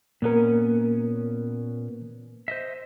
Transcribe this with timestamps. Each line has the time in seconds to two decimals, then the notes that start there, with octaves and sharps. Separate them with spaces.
0.22 A#2 A#3 B3 C#4 A#4
2.48 C5 D#5 E5